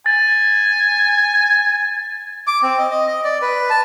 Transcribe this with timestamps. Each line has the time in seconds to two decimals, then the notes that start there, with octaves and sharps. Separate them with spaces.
0.06 G#5 A6
2.47 D6
2.63 C4
2.79 D#5
2.91 D#5
3.08 D#5
3.25 D5
3.42 B4
3.70 A5